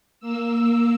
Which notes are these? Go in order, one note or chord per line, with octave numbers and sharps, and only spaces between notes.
A#3 E6